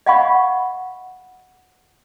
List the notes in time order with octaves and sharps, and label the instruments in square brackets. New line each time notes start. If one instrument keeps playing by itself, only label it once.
[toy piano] D#5 F5 F#5 G#5 B5 C#6